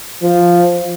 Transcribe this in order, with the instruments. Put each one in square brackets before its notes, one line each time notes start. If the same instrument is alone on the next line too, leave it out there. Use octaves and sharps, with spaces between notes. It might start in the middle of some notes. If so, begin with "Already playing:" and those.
[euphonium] F3